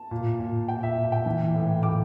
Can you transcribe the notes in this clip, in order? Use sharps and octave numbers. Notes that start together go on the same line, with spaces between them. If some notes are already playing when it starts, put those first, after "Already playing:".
Already playing: A5
A#2
A#2
A#2 G5
E5
A#2
G5
E3
A2
A2 D6